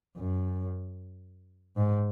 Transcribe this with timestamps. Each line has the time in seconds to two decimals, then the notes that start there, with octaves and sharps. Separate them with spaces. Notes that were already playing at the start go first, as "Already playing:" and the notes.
0.17 F#2
1.77 G#2